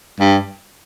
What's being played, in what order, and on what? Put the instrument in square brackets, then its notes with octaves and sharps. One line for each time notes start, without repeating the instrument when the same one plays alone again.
[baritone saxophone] G2